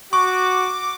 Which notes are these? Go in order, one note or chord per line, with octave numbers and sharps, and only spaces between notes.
F#4 C#6 D6